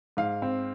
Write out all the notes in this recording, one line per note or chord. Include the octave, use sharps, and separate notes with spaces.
G#2 F5
C4